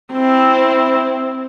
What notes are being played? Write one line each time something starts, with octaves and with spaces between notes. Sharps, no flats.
C4 E4